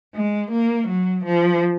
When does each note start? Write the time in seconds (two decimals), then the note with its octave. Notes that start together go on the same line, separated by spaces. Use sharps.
0.14 G#3
0.51 A#3
0.88 F#3
1.25 F3